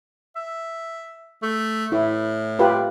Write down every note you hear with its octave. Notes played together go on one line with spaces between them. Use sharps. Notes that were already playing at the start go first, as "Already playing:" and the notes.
E5
A3
A2 E4
F4 G4 B4